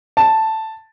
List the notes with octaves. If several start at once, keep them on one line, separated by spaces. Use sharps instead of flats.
A5